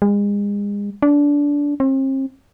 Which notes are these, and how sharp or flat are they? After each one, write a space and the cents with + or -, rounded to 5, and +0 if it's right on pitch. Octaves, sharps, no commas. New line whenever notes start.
G#3 -35
D4 -20
C4 +40